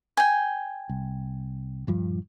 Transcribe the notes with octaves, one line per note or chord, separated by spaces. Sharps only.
G5 G#5
C2
D#1 G2 F3